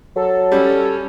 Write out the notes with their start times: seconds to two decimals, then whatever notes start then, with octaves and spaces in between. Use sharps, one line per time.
0.16 F#3 A4
0.52 G3 C#4